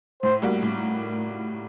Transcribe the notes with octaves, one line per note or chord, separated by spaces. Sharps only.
A2 C5
G3 A#3 F#4
A2